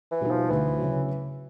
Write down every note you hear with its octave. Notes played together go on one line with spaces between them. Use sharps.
E3
B2 G3 B3 D#4
F3
D2 E3
C#3 F#3